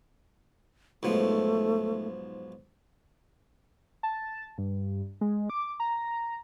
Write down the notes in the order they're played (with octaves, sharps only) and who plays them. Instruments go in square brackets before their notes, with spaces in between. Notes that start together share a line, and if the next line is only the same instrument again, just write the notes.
[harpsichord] B1 G#2 F3 [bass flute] A3
[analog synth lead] A5
G2
G#3
D6
A#5